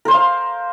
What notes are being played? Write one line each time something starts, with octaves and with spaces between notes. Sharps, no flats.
A#4 C5 F5 C6